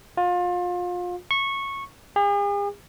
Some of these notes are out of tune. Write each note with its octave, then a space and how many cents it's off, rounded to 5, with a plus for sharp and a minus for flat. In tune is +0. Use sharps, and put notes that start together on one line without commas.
F4 +30
C#6 -15
G#4 -45